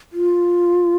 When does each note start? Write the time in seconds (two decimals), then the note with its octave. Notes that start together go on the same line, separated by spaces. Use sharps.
0.13 F4